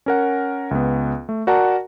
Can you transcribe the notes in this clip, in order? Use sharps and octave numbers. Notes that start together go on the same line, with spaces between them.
C#4 A#4 F#5
C#2 B3
A3
F#4 A#4 D5 F#5 A5 A#5